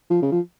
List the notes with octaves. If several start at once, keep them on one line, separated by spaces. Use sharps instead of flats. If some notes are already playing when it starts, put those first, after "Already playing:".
F3
C#3
F3